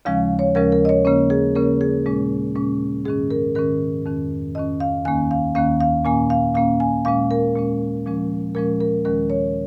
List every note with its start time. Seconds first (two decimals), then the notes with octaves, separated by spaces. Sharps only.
0.05 D#2 C#3 F3 G#3 C#4 F5
0.39 C#5
0.55 D#2 C#3 F3 G#3 C#4 A#4
0.72 A#4
0.85 D#5
0.89 C#5
1.05 C#3 A#3 C#4 C#5
1.30 G#4
1.55 C#3 A#3 C#4 A#4
1.81 G#4
2.06 A#2 G#3 C#4
2.55 A#2 G#3 C#4
3.05 G#2 D#3 C#4 G#4
3.31 A#4
3.55 G#2 D#3 C#4 A#4
4.06 F2 D#3 C#4
4.55 F2 D#3 C#4 D#5
4.80 F5
5.05 D#2 D#3 A#3 C#4 G#5
5.31 F5
5.55 D#2 D#3 A#3 C#4 F5
5.81 F5
6.05 A#2 A#3 C#4 G#5
6.30 F5
6.55 A#2 A#3 C#4 F5
6.80 G#5
7.05 A#2 G#3 C#4 F5
7.31 A#4
7.55 A#2 G#3 C#4
8.06 A#2 F3 G#3 C#4
8.55 A#2 F3 G#3 C#4 A#4
8.80 A#4
9.05 D#2 D#3 G#3 C#4 A#4
9.30 C#5